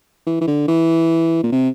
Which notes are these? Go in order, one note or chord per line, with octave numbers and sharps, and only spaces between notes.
E3
E3
D3
E3
A#2
C3